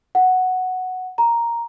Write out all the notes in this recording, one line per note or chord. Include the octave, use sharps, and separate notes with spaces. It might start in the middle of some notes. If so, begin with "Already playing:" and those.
F#5
A#5